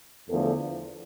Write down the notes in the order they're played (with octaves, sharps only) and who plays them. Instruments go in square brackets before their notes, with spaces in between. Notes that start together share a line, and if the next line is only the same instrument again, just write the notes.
[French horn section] E2 D3 F3 A3 A4